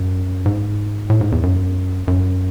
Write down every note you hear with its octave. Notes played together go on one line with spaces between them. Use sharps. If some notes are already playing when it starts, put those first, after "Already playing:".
Already playing: F#2
G#2
A2
G#2
E2
F#2
F#2